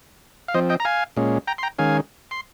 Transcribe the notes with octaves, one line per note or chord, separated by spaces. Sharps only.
F5
F3 C4 C5 D#5
D#5 G5
A#5
F5 G#5
A#2 G#3 C#4
G5 A#5
C6
G5 A#5
D#3 G#3 C#4 F5 G#5
C6